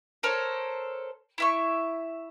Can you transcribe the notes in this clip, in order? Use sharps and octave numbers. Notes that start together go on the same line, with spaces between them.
A4 A#4 C5 C#5
E4 E5 C#6